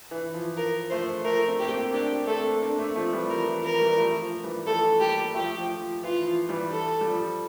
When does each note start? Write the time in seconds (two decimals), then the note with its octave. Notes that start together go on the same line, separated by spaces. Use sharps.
0.11 E3
0.34 F3
0.56 F3 A#4
0.90 F3 A3 C5
1.24 F3 A3 A#4
1.48 A3 C4
1.59 A#3 G4
1.70 A3 C4
1.93 A#3 D4 G4
2.27 A3 C4 A4
2.62 A#3 D4
2.79 A3 C4
2.96 F3 A3
3.13 E3 G3
3.30 F3 A#4
3.48 E3
3.64 F3 A#4
3.81 E3 G3
3.98 F3 A3
4.21 F3
4.44 E3 G3
4.66 F3 A3 A4
5.00 G3 A#3 G4
5.34 F3 A3 G4
5.58 F3
5.81 F3
6.03 E3 F4
6.26 F3
6.49 E3 G3
6.72 A4
7.01 G3
7.06 F3